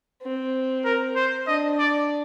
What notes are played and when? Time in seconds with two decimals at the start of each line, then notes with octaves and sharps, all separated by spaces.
0.22 C4
0.85 A#4
1.16 C5
1.47 D4 D#5
1.79 D5